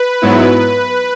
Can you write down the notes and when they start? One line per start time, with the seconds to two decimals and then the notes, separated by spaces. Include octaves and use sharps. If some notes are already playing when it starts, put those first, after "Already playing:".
Already playing: B4
0.22 G#2 F#3 B3 E4